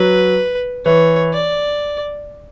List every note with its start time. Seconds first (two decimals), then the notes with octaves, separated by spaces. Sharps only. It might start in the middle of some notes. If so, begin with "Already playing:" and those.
Already playing: F#3 B4
0.85 E3 C#5
1.33 D5